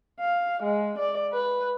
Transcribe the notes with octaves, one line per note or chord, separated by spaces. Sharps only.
F5
G#3
D5
B4